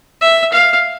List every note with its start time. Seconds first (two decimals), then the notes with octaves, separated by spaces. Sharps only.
0.21 E5
0.53 F5